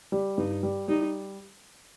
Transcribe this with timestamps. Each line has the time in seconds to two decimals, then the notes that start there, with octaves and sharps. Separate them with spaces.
0.12 G3
0.38 G2 D#4
0.63 G3
0.88 G3 D#4